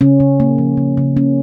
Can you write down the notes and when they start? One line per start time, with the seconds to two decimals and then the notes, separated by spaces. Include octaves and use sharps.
0.01 C#3 C#4
0.20 C#3
0.40 A#3
0.58 F3
0.77 C#3
0.97 C#3
1.17 A#3 C#4